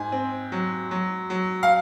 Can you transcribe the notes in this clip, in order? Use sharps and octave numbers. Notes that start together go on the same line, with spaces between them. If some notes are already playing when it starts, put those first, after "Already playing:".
Already playing: G#2 G#5
C4
F#3
F#3
F#3
F5